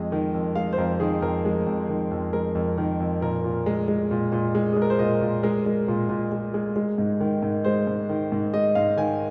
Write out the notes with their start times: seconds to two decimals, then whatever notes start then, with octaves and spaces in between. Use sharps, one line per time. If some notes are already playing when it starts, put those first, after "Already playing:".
Already playing: F2 G#3 D#5
0.12 D#3
0.34 F2
0.55 G#3 F5
0.73 C5
0.78 F2 A#4
1.00 D#3 G#4
1.22 F2 A#4
1.45 G#3
1.66 F2
1.89 D#3
2.11 F2
2.33 G#3 A#4
2.55 F2
2.78 D#3
3.00 F2
3.21 A#2 A#4
3.44 A#2
3.66 G#3
3.88 G#3
4.11 A#2
4.32 A#2
4.55 G#3
4.73 G#3 G#4
4.82 A#4
4.90 C5
4.99 A#2 D#5
5.21 A#2
5.43 G#3 A#4
5.66 G#3
5.88 A#2
6.09 A#2
6.32 G#3
6.54 G#3
6.76 G#3
6.98 G#2
7.20 D#3
7.42 G#2
7.64 G#3 C5
7.87 G#2
8.09 D#3
8.32 G#2
8.53 G#3 D#5
8.75 G#2 F5
8.97 D#3 G#5